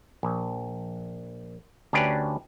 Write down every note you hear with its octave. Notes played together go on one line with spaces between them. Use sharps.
A#1
D2 C#4 D4 G4 B4 D5